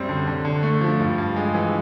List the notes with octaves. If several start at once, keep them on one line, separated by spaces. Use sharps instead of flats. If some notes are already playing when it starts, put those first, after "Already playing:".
Already playing: F#2 G3 C4
D3
D3
D3
A3
F3
G2
G2
G#3
E3